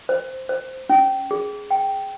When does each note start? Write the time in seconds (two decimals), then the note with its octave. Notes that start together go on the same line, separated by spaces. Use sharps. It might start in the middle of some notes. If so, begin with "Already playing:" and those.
0.09 C5
0.49 C5
0.89 C#4
1.31 G#4
1.71 G5